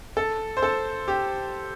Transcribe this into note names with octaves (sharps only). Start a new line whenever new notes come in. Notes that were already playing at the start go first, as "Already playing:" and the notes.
A4
C5
A4
G4